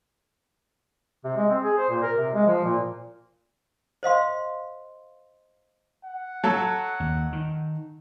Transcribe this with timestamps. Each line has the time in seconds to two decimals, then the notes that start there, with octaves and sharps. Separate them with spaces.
1.24 C3
1.36 G#3
1.50 C4
1.63 G#4
1.77 C5
1.89 A#2
2.02 A#4
2.17 C3
2.33 G#3
2.47 F3
2.64 A#2
4.03 C5 D#5 F5 C6
6.05 F#5
6.44 F#3 A4
7.00 D#2
7.32 D#3